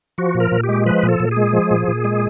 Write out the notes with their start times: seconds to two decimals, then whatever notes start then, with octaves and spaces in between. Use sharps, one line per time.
0.18 F3 F#4
0.35 A#2
0.40 A#4
0.52 A#2
0.64 G4
0.69 G#3
0.86 F3 B4
1.03 A#2
1.09 A4
1.20 A#2
1.31 G#4
1.36 G#3
1.53 F3
1.71 A#2
1.88 A#2
2.05 G#3